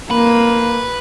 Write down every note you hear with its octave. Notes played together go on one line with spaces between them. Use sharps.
A#3 B4